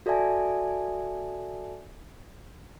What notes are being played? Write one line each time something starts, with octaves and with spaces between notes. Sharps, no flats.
F#4 A4 D5 E5 G#5 A5